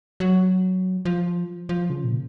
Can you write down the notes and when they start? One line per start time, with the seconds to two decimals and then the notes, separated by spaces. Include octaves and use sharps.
0.20 F#3
1.05 F3
1.69 F3
1.90 C#3
2.04 A#2